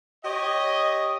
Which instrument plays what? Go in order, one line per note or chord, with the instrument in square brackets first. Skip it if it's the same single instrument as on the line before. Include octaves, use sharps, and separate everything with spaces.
[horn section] G4 C#5 D#5